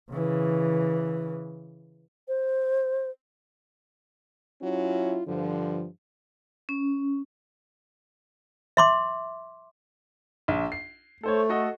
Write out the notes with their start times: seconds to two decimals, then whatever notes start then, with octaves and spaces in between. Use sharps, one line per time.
0.11 C#3 E3
2.28 C5
4.62 F#3 C#4 E4 F4
5.28 G2 D3 F3
6.69 C#4
8.77 E5 C6 D6
10.48 A#1
10.72 C7
11.23 A3 A4 C5 C#5
11.49 F#4 A4 D#5